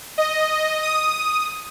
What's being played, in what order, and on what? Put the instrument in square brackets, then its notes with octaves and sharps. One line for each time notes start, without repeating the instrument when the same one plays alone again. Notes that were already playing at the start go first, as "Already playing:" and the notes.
[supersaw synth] D#5
D#6